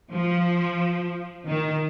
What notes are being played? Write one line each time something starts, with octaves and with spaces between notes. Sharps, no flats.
F3
D#3